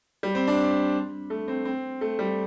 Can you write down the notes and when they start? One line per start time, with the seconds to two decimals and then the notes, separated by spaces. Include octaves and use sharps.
0.23 G3
0.35 C4
0.47 D4
1.30 A3
1.48 C4
1.65 C4
2.01 A3
2.19 G3